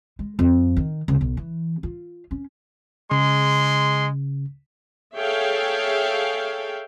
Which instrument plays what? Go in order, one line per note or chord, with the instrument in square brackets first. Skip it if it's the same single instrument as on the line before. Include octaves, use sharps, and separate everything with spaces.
[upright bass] G#3
F2
D#3
C#2
B1
E3
F4
C#4
[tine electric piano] C#3 [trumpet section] G#3 C6
[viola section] G#4 A4 C#5 E5 F5 G5